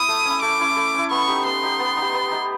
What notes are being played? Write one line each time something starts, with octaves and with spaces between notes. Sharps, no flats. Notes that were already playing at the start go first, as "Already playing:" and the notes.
Already playing: E4 D#6
A3
C#4 E4
A3 D6
C#4 E4
A3
C#4 E4
B3 C#6
D#4 G4
B3 C6
D#4 G4
B3
D#4
G4
B3
D#4 G4